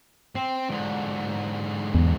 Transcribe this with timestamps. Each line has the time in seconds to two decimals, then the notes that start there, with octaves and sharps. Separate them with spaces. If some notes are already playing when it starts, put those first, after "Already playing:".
0.35 C4
0.70 G#2 D3
1.95 E2